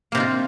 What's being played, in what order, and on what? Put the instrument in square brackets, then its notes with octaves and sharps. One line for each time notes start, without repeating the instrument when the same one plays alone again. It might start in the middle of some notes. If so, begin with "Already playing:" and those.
[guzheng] A#3
C3
D#4
F4